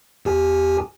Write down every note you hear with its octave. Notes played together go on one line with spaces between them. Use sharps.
E2 G4 G#5